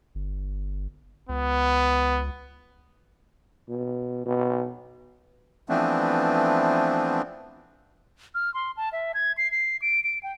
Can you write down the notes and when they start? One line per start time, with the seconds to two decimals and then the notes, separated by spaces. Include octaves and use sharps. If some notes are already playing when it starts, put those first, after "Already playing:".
0.15 G1
1.29 C#2 B3
3.69 B2
4.26 B2
5.69 E3 F3 A3 B3 C4 D4
8.35 F6
8.54 C6
8.77 A5
8.93 E5
9.14 G#6
9.38 C7
9.51 C7
9.82 D7
10.04 D7
10.23 G5